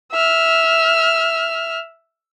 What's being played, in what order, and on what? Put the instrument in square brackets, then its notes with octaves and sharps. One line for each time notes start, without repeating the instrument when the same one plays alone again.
[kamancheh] E5 F6